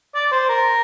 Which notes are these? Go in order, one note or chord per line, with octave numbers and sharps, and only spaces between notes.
D5
C5
A#4